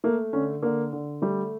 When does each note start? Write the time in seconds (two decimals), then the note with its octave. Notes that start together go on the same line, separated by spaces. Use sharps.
0.04 A3 A#3
0.33 D3 C#4
0.63 D3 A#3
0.93 D3
1.22 G3 A3